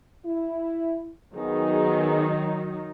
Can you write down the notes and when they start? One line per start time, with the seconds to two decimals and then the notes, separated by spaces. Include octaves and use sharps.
0.26 E4
1.36 D#3 F#3 B3 D#4 G#4